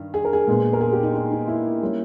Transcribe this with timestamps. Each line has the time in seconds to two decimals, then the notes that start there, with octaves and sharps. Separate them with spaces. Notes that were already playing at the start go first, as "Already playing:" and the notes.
Already playing: G2 D#3
0.14 G#4
0.25 A#4
0.33 G#4
0.47 A#2 G#3 B3
0.73 A#4
0.81 G#4
0.92 G4
1.03 D#4
1.15 D#4
1.32 D#4
1.48 E4
1.83 G3 A#3 C#4